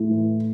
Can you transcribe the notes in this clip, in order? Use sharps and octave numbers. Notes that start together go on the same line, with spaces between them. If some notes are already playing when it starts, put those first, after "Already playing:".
Already playing: A2
E3